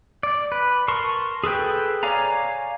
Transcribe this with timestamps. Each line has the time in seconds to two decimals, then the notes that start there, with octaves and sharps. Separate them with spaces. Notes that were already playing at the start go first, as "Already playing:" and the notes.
0.23 D5
0.52 B4
0.88 A#4 A5 C6 C#6
1.44 G#4 A4 B4 G5
2.03 C#5 D5 F5 G#5 A#5